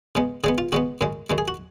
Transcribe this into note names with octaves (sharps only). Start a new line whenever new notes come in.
C#3 G#3 B3
C#3 G#3 B3 G#4
F4
C#3 G#3 B3 F#4
F#2 C#3 G#3
F#2 C#3 G#3
G#4
F#4